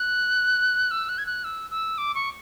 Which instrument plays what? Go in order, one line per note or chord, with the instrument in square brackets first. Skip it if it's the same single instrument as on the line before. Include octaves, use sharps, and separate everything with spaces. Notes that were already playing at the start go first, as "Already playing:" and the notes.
Already playing: [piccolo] F#6
E6
F#6
G#6
F#6
E6
E6
D6
C#6